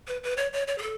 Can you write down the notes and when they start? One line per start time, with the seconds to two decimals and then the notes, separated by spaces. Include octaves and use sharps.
0.07 B4
0.23 B4
0.37 C#5
0.53 C#5
0.68 C#5
0.78 G#4
0.82 A4